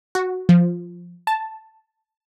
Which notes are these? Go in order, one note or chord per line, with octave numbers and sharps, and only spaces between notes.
F#4
F3
A5